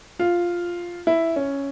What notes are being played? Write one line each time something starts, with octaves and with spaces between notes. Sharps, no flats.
F4
E4
C#4